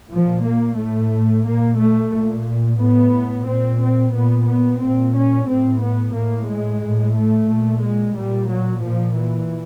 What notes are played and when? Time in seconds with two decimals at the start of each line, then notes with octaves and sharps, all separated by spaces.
0.11 A#2 F3
0.44 A#3
0.78 A2 A3
1.45 A#2 A#3
1.78 A3
2.12 A#2
2.79 A2 B3
3.45 A#2 C4
3.80 C4
4.13 A#2 B3
4.46 B3
4.80 A#2 C4
5.13 C#4
5.47 A2 C4
5.80 B3
6.14 A2 A#3
6.48 G#3
6.81 A2
7.15 A3
7.48 A#2
7.82 G#3
8.15 A#2 G3
8.49 F#3
8.82 A#2 F3
9.16 E3